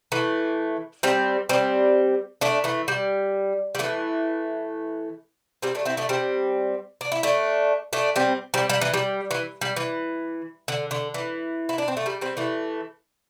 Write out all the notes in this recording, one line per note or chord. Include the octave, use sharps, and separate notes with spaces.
E3 A3
G3 C4
G3 C4
A3 D4
E3 A3
G3
G3
E3 A3
G3 C4
A3 D4
C4 E4
A3 D4
G3 C4
D4
E4
A3 D4
A3 D4
G3 C4
G3 C4
G3
E3
G3
E3
G3
E3
D3
D3
E3
E4
D4
C4
A3
G3
G3 C4
E3 A3